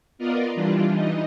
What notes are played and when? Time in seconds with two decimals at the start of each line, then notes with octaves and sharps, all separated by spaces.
0.18 B3 F4 A#4 D5 D#5
0.55 E3 G3 D4 F4
0.89 E3 D#4 D#5